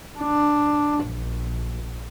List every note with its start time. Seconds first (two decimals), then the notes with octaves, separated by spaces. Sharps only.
0.19 D4
1.06 A#1